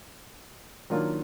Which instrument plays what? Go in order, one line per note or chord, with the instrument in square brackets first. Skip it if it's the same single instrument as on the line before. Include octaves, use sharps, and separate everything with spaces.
[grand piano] D#3 F#3 A#3 D4 F4